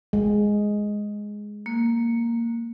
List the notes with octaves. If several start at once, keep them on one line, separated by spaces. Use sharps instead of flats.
G#3
A#3